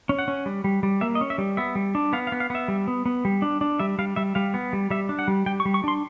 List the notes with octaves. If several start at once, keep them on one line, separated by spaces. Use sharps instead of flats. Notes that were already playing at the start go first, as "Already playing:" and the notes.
C#4
F#5
C#4
G3
G3
G3
A#3 E5
D#5
C#4
E5
G3
B3 E5
G3
D4
B3 F5
F5
B3
F5
B3 E5
G3
B3
B3
G3
D4
D4
G3 E5
G3 F5
G3 E5
G3 F5
B3
G3
G3 E5
D4
F#5
G3
G3 G5
C#6
G3
C#6
D4 C6